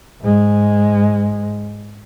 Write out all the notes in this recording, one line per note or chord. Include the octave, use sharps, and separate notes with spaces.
G#2 G#3